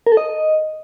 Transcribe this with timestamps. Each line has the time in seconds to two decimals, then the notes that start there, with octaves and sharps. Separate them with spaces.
0.07 A#4
0.12 A4
0.17 D#5